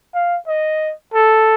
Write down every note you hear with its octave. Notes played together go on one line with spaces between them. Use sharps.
F5
D#5
A4